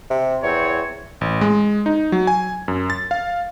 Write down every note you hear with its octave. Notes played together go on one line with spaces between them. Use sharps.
C3
E2 C4 C#5
A1
G#3
D#4
F#3
G#5
F#2
A6
F5